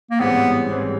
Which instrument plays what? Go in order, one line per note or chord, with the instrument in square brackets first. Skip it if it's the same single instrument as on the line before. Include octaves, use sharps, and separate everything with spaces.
[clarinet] A#3
[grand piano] A1 G#2 E3 G3 C4 [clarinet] B3
[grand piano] A1 G#2 E3 G3 C4